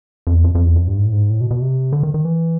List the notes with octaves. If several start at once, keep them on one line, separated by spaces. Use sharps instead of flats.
F2
E2
F2
F2
E2
F2
G2
G#2
A2
G#2
A2
B2
B2
C3
D3
D#3
D#3
E3